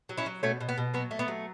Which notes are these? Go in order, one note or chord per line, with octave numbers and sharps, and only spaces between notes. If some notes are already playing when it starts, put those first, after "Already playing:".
F#3
C#4 E4
F#3
B2 A3 C#4
B2
B3
B2
F#3 B3
A3
B3
F#3